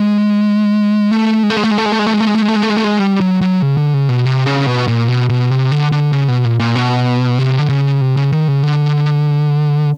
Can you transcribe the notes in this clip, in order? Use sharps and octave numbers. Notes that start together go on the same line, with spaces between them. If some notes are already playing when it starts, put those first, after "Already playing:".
Already playing: G#3
A3
G#3
A3
G#3
A3
G#3
A3
G#3
A3
G#3
A3
G#3
A3
G#3
A3
G#3
A3
G#3
A3
G#3
A3
G#3
G3
F#3
F#3
C#3
D3
C#3
B2
C3
C#3
B2
A#2
B2
B2
C3
D3
D3
C#3
B2
A#2
A#2
B2
C3
D3
C#3
C3
C#3
D#3
C#3
D3